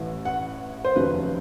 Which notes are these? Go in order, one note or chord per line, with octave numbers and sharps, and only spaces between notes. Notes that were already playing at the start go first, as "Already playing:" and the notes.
Already playing: A1 A2 E3
F#5
C5
F1 D#2 C#3 F#3 B4